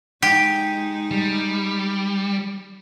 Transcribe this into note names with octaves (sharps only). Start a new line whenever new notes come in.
G#3 D#4 G4
G3